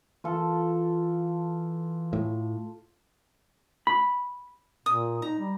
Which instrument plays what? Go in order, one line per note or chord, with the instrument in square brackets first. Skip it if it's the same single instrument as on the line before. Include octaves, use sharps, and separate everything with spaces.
[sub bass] E3 [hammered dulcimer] F4 A4
[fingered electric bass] A2
[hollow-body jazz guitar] B5
[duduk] A#2 [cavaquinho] D#6
[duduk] D#4 [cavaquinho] A#5
[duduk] G3